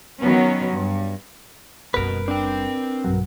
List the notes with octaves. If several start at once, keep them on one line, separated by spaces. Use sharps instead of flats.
D#3 F#3 B3 C#4
G2
F#1 B2 G3 A#4 B4
C4 D4 G5
B1 G2 F#3